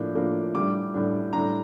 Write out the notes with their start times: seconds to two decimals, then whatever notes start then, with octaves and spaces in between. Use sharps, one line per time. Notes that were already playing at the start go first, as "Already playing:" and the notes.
Already playing: A2 F3 A#3 D4
0.15 A2 F3 A#3 D4
0.55 A2 G3 D4 D6
0.94 A2 G3 D4
1.33 A2 G3 D4 A#5